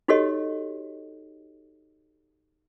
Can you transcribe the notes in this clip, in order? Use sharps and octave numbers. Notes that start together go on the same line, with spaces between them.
D#4 F#4 G4 A4 C#5 D#5